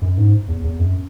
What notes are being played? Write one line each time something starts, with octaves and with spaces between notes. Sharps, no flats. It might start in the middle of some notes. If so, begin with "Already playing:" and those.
F#2
G#2
E2
E2
F#2